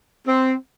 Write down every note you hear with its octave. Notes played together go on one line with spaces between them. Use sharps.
C4